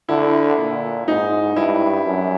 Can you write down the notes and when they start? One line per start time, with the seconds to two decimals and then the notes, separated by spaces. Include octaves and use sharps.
0.09 D3 E4
0.58 A#2
1.07 G#2 D#4
1.56 G2 E4
2.06 F#2